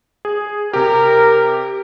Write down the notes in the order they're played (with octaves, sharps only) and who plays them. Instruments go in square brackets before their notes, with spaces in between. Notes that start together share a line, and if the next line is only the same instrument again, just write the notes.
[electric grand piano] G#4
[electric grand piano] C3 G4 [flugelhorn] A#4